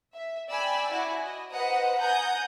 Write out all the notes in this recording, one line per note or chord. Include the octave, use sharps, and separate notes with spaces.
E5
D5 G5 G#5 B5 E6
E4 F#4 D5 G#5
D#5
B4 C5 D#5 F#5 A#5 D#6
F#5 G#5 A#5 D#6 G6